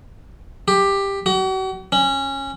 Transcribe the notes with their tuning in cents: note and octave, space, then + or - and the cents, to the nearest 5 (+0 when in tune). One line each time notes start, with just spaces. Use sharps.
G4 +10
F#4 +40
C#4 -15